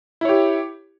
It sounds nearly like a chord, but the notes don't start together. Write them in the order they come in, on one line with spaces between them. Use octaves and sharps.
E4 C#5 G4